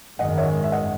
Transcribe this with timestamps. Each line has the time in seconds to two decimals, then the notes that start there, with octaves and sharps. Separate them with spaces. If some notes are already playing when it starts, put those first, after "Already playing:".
0.19 G#1 F#2 D#3 G#3 D#5 F#5
0.38 C#5 E5
0.64 E5
0.72 D#5 F#5